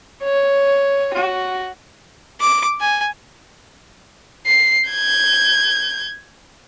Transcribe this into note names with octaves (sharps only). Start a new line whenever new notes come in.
C#5
F#4
D6
G#5
C7
G6 G#6